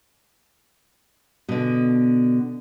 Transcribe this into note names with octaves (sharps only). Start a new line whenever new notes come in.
B2 D3